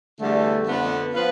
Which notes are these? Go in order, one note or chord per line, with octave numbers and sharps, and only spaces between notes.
E2 D3 G3 A3
F2 D3 F3 B3
F3 B3 F4 B4